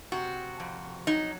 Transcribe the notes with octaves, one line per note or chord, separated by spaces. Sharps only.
C3 F#4
F2
F#3 D#4